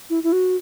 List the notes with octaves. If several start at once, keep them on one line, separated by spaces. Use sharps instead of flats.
E4
E4
F#4